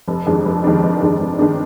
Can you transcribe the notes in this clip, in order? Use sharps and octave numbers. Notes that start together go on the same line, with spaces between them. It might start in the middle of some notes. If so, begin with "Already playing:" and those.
F1
F2 D#3 G#3 D4
F1
F2 D#3 G#3 D4
F1
F2 D#3 G#3 D4
F1
D#3 G#3 D4